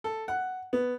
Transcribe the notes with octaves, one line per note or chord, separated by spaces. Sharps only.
A4
F#5
B3